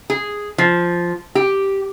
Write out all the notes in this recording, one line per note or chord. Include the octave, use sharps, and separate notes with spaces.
G#4
F3
G4